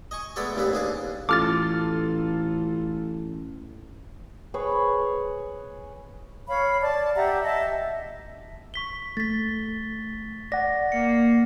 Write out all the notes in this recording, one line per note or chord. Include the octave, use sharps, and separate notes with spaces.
D#5 G#5 C#6
G#3 A3 B3 A4 C#5 D5
A1 D#2 G3 C4 E4 B4
D#2 D4 G#4 A5
A1 F4 A4 D6 F6 A6
G#4 B4 C#5
C#5 F5 B5
D5 A5
G4 E5 F#5 A#5
D#5 E5 A5
C#6 B6 G7
A3 A6 B6
D5 F#5 A#6
A#3 C#7